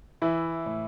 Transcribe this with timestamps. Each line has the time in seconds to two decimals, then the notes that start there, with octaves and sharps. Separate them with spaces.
0.22 E3 E4
0.66 A2